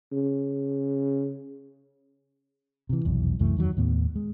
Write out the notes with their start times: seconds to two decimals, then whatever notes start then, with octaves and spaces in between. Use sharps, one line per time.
0.12 C#3
2.89 C3 E3
3.05 F1 B1 E2
3.39 C2 F#2 E3 A3
3.57 E2 D#3 F#3
3.77 D#2 A2 B3
4.16 G#3